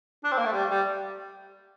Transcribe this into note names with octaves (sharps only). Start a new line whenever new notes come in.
D4
C4
A#3
A3
G3
G3